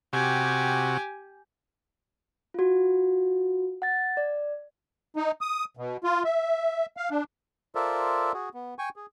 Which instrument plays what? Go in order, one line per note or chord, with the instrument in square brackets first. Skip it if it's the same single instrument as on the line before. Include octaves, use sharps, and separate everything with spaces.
[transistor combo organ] C3 F#4 [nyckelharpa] G4 G#5
[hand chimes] F4 F#4
F#5 A6
D5
[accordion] D#4
D#6
B2
F4
E5
F5
D4
[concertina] F4 A4 A#4 C5 D5 E5
F#4 G#4
B3
G5 G#5 C#6
G#4